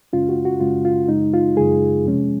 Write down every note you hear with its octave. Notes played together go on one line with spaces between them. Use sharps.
F#2 C#3 G#3 C#4 F4
F#4
F#4
F#2 C#3 G#3 C#4 F4
F4
F#2 C#3 G#3 D#4
F4
F#2 C#3 G#3 G#4
F2 C3 F3 G#3 C#4